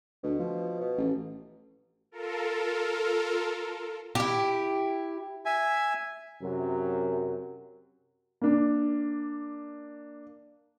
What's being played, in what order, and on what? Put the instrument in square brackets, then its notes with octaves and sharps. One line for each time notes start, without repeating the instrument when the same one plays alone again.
[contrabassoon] D2 [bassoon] B2
[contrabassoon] F3
[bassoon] B2
[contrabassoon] A1
[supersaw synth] F4 A4 A#4
[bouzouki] E4 G4
[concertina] E5 G#5
[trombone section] F#2 C3 F#3 A#4
[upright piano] A#3 D4